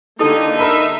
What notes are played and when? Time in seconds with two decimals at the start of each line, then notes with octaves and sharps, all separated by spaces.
0.19 D3 A#3 D#4 E4 G4 A4 A5
0.59 A#4 E5 B5